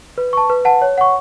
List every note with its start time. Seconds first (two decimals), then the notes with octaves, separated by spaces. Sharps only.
0.18 B4
0.33 A5 C#6
0.50 B4
0.65 F#5 A5
0.82 C#5
0.98 F#5 C#6